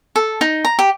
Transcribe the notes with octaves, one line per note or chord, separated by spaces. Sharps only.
A4
D#4
A#5
G4